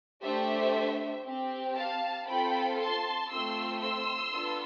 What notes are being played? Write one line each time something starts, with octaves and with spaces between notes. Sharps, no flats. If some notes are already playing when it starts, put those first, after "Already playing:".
A3 D4 G4 C5 E5
C4 G4
F5 A5
C4 F4 A4 G5 B5
A5 C6
A3 C4 F4 C6 E6
C6 E6
B3 D4 F4 A4